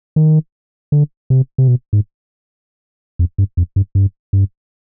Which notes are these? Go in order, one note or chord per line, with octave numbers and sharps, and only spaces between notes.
D#3
D3
C3
C3
B2
G#2
F2
G2
F2
G2
G2
G2